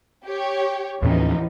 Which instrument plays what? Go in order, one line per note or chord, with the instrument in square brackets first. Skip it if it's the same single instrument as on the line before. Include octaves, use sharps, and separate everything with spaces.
[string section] G4 C#5
[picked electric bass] D#2 A2 C#4 [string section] E3 F3 D#4